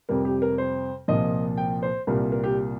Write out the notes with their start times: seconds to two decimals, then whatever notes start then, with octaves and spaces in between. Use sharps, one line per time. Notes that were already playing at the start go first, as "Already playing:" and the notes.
0.09 F2 C3 G3 A#4
0.25 G4
0.42 A#4
0.58 C5
1.08 C2 A#2 F3 D#5
1.58 G5
1.82 C5
2.07 C2 A#2 G3 A#4
2.32 A#4
2.44 G4